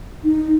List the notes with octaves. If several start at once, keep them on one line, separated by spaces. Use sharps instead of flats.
D#4